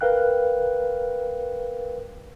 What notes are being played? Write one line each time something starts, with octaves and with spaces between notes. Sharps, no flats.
A#4 B4 F5 G5 F#6